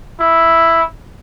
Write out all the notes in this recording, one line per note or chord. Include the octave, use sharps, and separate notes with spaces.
E4